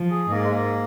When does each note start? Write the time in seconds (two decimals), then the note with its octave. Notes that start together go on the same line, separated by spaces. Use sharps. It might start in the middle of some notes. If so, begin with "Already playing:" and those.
Already playing: F3
0.10 G#4
0.30 G#2 A#3
0.43 G#3
0.51 A#3